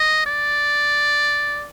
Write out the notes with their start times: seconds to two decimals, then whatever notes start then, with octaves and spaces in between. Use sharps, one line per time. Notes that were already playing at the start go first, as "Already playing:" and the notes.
Already playing: D#5
0.26 D5